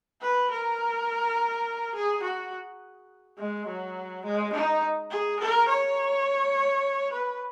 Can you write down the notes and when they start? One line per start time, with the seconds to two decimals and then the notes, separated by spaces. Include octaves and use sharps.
0.22 B4
0.51 A#4
1.95 G#4
2.23 F#4
3.39 G#3
3.68 F#3
4.25 G#3
4.53 D#4
5.11 G#4
5.40 A#4
5.68 C#5
7.12 B4